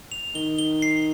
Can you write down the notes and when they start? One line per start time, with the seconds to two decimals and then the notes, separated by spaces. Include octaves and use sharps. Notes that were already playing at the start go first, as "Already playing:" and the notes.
0.12 F7
0.35 D#3 G7
0.59 G7
0.82 C7